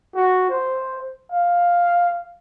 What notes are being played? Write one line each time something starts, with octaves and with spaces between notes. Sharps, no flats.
F#4
C5
F5